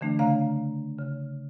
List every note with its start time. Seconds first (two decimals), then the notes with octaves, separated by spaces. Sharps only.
0.01 D3 E3 A3 D4
0.19 C#3 A3 F5 A#5
0.98 C#3